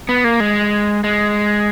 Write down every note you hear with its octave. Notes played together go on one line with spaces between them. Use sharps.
B3
A#3
G#3
G#3